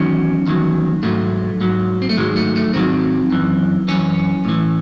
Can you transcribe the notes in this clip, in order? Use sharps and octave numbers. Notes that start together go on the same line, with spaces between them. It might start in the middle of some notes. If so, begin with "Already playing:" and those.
Already playing: E2 D#3 F#3 C#4
E2 D#3 F#3
G#2 F#3 A3
G#2 F#3
C4
A3
G#2 D#3 F#3 G#3
A3
A3
G#2 D#3 F#3 C4
F#2 E3
F#2 E3 C#4
A2 E3